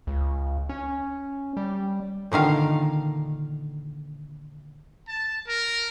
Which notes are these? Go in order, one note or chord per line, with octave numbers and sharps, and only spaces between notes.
C#2
C#4
G3
A#2 D3 D#3 F5
A5
A#4